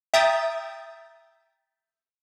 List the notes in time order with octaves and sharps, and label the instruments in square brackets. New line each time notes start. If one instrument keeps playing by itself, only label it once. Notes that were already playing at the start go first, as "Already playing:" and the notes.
[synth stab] E5 G5 A#5 D#6 G6 A6